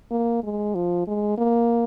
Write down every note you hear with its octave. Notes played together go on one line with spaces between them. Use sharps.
A#3
G#3
F3
G#3
A#3